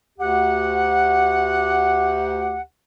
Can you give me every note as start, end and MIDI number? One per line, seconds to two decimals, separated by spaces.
0.19 2.60 38
0.19 2.60 67
0.19 2.60 78